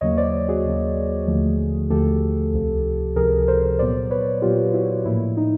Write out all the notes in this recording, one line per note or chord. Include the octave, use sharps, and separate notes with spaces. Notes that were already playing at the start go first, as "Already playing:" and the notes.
D#2 C#3 F#3 A#3 C#5 D#5
C5 D5
F#4 G#4
D#2 C#3 F#3 A#3
D#2 D3 F3 A3
D#2 D3 F3 A3 G4 A4
C#2 C3 F3
C#2 C3 F3 G#4 A#4
A#4 C5
A#2 F#3 B3 C5 D5
B4 C#5
A#2 F#3 B3 F4 G4
E4 F#4
A2 F3 A#3 E4
D#4